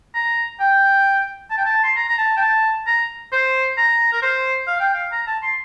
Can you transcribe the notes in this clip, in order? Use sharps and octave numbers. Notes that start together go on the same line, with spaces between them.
A#5
G5
A5
G5
A5
C6
A#5
A#5
A5
G5
A5
A#5
C5
A#5
A#4
C5
F5
G5
F5
A#5
A5
C6